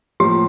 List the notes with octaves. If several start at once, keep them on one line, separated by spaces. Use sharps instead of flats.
A2 F3 A#3 G4